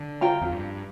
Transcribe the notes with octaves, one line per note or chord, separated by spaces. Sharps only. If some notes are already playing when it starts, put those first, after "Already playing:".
Already playing: D3
F4 C5 G5 A#5
F2
G2